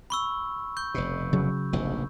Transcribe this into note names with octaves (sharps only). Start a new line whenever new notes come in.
B5 C#6 E6
C#6 G6
F1 B2
C#3 F#3
F1 A#1 G#2